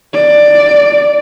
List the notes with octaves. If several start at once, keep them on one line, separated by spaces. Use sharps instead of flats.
D5